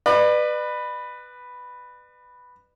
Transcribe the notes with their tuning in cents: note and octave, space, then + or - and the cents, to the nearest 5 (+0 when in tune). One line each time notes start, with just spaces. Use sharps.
B4 +0 D5 +40